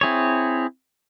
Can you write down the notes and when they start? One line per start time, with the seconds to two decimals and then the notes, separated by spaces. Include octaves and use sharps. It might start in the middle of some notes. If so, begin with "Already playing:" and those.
0.01 C4 E4 G#4 C#5